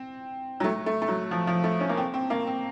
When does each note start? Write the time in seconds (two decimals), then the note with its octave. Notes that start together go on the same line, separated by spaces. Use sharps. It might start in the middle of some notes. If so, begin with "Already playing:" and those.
Already playing: C4
0.60 F#3
0.64 A3
0.86 A3
1.02 A3
1.08 F#3
1.31 F3
1.47 F3
1.64 A3
1.80 C#4
1.89 A#3
1.97 C4
2.14 C4
2.30 A#3
2.47 C4